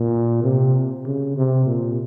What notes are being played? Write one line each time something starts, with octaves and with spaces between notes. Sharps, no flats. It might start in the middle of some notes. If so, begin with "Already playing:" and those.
Already playing: A#2
C3
C#3
C3
A#2